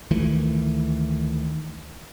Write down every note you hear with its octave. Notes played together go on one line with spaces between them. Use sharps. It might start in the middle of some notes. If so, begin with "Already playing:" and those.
D2 D#3 E3 A3